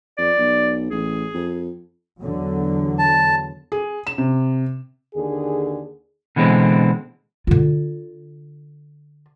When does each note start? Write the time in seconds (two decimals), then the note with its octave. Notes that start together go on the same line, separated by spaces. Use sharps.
0.18 F2 D5
0.38 B1
0.91 A1 G#4
1.34 F2
2.22 E2 D3 F#3
2.99 A5
3.72 G#4
4.07 E7
4.18 C3
5.15 D#2 D3 G#4
6.36 B2 D3 E3 G#3 C4
7.47 D3 F4